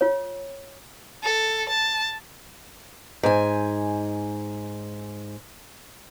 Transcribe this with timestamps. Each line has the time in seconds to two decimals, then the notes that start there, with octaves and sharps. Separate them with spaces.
0.01 F4 C#5
1.24 A4
1.69 A5
3.23 G#2 G#5